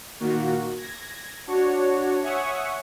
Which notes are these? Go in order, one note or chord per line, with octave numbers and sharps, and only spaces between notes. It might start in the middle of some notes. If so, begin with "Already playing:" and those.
A#2 D#3 A#3 F#4
G#6 A#6
D4 F#4 C#5
C#5 E5 F#5 G#5 C#6 D#6